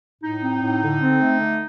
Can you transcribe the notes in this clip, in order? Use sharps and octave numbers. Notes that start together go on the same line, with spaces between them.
A2 D#4
C4
A2
D3
C4
A3
D3